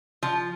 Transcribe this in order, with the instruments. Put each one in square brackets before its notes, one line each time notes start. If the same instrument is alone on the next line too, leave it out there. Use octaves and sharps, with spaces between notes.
[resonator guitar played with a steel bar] F3